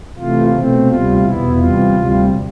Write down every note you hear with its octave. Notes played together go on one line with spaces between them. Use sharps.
C3 E3 A3 F4
B2 A3 C4
D2 C3 G3 F4
E2 B2 B3 E4
C3 E3 G3 F4
D2 C3 G3